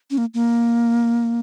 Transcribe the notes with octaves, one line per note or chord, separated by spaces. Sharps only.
C#4
A#3
A#3